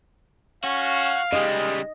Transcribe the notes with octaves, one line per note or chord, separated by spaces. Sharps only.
C#4 F#4 F5
C#3 G3 G#3 D#5